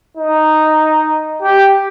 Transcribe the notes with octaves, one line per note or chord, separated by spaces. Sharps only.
D#4
G4